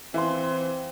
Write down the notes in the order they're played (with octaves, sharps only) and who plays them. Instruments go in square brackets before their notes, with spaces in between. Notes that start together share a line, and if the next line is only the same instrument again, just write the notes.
[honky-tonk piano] E3 [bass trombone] C4 [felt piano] E5 F5 C6